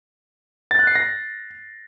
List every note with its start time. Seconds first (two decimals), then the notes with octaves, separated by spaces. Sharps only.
0.71 A6
0.79 F#6
0.87 C7
0.95 A#6